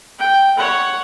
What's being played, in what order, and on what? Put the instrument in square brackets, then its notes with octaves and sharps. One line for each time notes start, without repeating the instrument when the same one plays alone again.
[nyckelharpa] G5
C#5 F#5